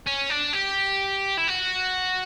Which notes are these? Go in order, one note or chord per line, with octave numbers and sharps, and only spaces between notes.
C#4
D4
G4
E4
F#4